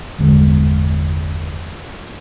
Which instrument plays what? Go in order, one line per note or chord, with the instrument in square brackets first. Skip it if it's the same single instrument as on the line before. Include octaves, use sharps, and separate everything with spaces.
[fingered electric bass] G1 E2 D3 G#3